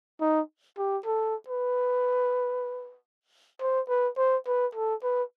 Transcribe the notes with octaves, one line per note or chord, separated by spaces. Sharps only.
D#4
G4
A4
B4
C5
B4
C5
B4
A4
B4